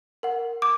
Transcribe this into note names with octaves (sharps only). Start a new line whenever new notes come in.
A#4 F#5
D6